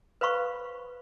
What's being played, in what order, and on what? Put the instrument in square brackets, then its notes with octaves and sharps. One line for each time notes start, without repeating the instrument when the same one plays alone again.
[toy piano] B4 C5 F5 B5 C#6